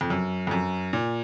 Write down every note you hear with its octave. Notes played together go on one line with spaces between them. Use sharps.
F2
F#2
F2
F#2
A#2